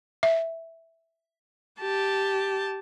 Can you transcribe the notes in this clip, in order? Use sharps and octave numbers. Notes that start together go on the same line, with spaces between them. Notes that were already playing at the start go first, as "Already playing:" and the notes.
E5
G4 A5